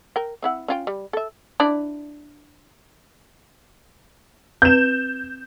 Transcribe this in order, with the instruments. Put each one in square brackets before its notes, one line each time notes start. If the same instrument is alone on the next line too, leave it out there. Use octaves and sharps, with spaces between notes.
[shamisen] A#4 G5
C4 E4 F#5
C#4 F4 G5
G3
A4 E5
D4 E4 D5
[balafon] C4 B4 [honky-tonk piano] G6 E7